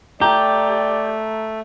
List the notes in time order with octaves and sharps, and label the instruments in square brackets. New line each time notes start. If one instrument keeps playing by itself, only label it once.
[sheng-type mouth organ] A3 [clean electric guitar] G4 [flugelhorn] D5 [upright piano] A#5 G6